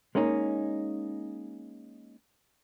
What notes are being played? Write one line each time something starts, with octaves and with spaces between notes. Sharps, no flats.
G#3 A#3 C#4 D#4